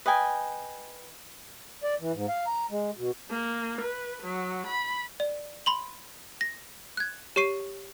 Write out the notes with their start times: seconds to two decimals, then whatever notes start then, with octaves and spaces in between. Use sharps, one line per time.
0.06 B4 D#5 G5 G#5
1.84 D5
2.00 E3
2.13 G#2
2.29 F5
2.47 A#5
2.70 G#3
2.97 B2
3.30 A#3
3.81 B4
4.24 F#3
4.67 B5
5.20 D5
5.66 B5 C6 F#7
6.41 A#6
6.97 F#6 G#6
7.36 G4 C#5 C#6 C7 D#7